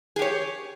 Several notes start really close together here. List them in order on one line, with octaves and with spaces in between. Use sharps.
G#4 G4 C#5